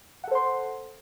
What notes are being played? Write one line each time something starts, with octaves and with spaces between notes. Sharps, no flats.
A4 C5 F#5 C6